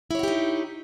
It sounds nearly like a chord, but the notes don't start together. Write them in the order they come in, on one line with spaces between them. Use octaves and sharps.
E4 C#5 F#4 G4 D#4